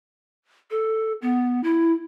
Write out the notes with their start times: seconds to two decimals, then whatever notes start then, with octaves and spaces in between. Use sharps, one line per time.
0.71 A4
1.22 B3
1.64 E4